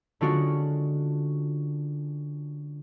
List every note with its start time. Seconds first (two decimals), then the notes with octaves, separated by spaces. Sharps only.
0.21 D3 G#3 C#4 D4 F4 F#4